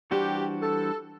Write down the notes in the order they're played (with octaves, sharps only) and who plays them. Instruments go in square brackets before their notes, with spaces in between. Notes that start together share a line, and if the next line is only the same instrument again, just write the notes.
[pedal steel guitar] E3 G3 D4 F#4 C5 [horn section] G4
[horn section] A4